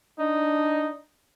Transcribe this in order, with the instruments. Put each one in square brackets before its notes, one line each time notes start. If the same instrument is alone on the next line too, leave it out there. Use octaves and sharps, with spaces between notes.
[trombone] D4 [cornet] D#4